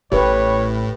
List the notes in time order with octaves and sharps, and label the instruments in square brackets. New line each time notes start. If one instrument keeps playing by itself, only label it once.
[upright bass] A1 [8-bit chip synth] A2 [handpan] G4 B4 [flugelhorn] C#5